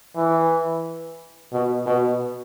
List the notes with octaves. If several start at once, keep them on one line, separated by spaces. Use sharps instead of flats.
E3
B2
B2